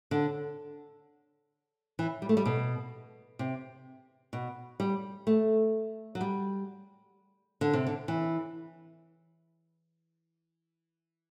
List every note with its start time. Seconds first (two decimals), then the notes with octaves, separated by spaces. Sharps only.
0.11 D3
1.99 E3
2.22 G3
2.29 A3
2.37 G3
2.45 B2
3.39 C3
4.33 B2
4.80 G3
5.27 A3
6.15 F#3
6.21 G3
7.61 D3
7.73 C3
7.87 D3
8.08 E3